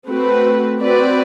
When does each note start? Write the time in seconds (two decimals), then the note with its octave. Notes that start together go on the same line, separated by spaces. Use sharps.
0.08 A3 C4 F#4 B4
0.81 C4 F#4 B4 D5